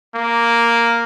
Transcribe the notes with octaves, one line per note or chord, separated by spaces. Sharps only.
A#3